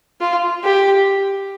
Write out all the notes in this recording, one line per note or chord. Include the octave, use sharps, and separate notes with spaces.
F4
G4